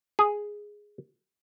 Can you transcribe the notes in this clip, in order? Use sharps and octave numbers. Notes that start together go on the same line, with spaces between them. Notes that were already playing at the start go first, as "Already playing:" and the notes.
G#4